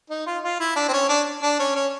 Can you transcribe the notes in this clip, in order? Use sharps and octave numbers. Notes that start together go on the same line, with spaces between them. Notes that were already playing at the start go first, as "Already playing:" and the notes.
D#4
F4
F4
E4
D4
C4
C#4
D4
D4
C#4
C#4